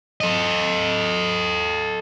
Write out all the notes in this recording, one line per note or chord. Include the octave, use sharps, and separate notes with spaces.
A4 D#5